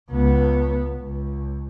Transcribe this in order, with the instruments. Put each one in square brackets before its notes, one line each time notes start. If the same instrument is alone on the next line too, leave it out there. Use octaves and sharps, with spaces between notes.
[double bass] C#2 B3
C#2